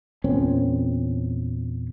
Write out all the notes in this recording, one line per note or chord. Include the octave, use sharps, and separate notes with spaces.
E2 A#2 C4 C#4